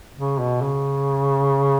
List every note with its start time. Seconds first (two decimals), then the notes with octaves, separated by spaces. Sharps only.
0.16 C#3
0.39 B2
0.62 C#3